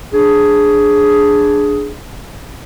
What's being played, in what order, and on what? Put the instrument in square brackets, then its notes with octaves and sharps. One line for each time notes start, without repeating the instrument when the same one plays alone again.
[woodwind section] D4 G#4